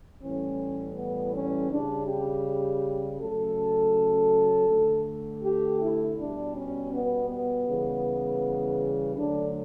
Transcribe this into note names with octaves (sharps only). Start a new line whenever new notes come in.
A2 E3 G3 C#4
B3
C#4
C#3 G3 D4
G4
C#3 F#3 A3 A4
D3 A3
G4
E4
B2 G3 D4
C#4
B3
B3
C#3 E3 G3
D3 F#3 A3 D4